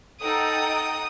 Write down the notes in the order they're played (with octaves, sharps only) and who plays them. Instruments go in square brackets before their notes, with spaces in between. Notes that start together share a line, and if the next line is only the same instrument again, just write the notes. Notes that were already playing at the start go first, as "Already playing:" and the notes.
[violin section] D#4 F#5 G5 [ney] A4 [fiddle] D#6